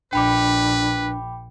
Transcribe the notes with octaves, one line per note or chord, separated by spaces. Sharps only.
A#1 D4 B4 G5 B5 D6